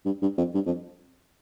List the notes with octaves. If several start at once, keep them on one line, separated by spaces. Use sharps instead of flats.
G2
G2
F2
G2
F2